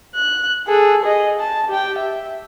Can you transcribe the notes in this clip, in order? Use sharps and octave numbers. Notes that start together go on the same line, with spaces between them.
F#6
G#4 A4
G#4 D#5
A5
G4 G5
E5